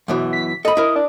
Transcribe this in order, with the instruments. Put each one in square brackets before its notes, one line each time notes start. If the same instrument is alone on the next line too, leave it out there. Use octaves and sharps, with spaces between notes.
[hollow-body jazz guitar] F#2 B2 E3
[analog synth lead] B6
[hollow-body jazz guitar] A4 B5 [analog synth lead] D#5
[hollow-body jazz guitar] E4 A#4
[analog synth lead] D4